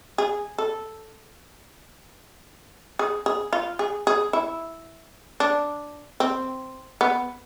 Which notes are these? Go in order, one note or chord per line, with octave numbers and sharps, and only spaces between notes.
G#4
A4
G#4
G#4
F4
G#4
G#4
E4
D4
C4
B3